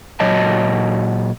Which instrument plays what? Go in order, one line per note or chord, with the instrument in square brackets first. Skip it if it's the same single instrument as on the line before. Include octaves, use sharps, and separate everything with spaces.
[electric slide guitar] A#2 F#3 C#5 D#5 A5